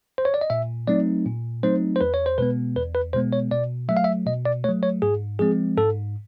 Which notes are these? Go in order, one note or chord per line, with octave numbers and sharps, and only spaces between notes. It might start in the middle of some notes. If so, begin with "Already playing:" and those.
C5
C#5
D5
D#5
A#2 E5
F#3 A3 C4 D#4 D5
A#2
F#3 A3 C4 D#4 C5
C5
E2 B4
C#5
C5
B2 G#3 B3 B4
E2 B4
B4
B2 G#3 B3 C5
C#5
B2 D5
F#3 A3 E5
F5
E5
B2 D#5
D5
F#3 A3 C#5
C#5
G#2 G#4
F3 G#3 C4 G#4
G#2 A4